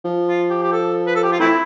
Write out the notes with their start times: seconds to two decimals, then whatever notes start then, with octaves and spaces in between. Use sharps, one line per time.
0.05 F3
0.27 F4
0.50 G4
0.62 G4
0.72 A4
1.07 B4
1.15 A4
1.23 G4
1.32 F4
1.40 E3 A3 C4 E4